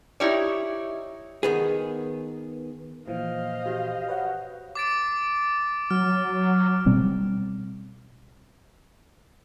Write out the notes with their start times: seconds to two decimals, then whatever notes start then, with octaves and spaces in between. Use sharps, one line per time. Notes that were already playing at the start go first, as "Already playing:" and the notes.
0.20 D#4 E4 G4 C#5 D5
1.43 D#3 B3 G#4
3.08 A#2 E3 F3 C5 D#5 F5
3.66 F#4 G4 G6
4.08 B4 C#5 F#5
4.75 D6 A6 D7
5.90 F#3 F6
6.86 B2 G3 C4